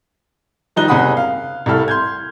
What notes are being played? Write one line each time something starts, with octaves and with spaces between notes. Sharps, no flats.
D#3 F3 G3 D#4 F#6 G7
F#1 C3 G#4 F#5 B5 D#6
F5
C2 A2 G3 E4 A4 F6
C6 G6 G#6